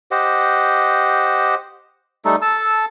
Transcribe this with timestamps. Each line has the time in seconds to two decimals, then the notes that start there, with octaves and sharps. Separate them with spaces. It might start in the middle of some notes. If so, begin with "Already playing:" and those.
0.11 G4 C5 D#5 F#5
2.25 G3 A3 D#4 A4
2.42 A4 A5 E6